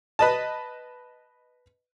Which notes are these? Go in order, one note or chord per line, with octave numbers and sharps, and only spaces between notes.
B4 D#5 A5